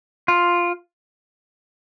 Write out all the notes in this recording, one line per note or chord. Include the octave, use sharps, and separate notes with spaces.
F4